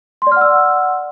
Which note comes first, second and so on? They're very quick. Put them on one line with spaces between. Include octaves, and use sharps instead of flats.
C6 D5 F6 F#5 E6